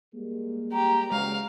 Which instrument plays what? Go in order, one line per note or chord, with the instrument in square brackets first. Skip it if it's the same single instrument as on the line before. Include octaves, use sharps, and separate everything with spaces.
[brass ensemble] G3 G#3 A#3
[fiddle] G4 [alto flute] A#5
[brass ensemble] F#1 [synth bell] G#3 [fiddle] F5